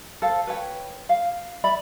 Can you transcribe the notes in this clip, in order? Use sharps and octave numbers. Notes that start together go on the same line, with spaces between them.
A4 C5 F5
B4 C#5 G5
F5
D5 E5 B5